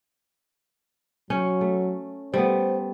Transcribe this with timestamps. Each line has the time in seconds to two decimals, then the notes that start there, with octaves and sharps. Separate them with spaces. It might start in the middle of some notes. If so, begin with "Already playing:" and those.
1.30 F#3 C#4
1.61 A3
2.34 G3 A3 B3 C5